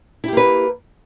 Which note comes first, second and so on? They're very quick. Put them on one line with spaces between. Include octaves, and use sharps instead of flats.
E4 G4 A#3 B4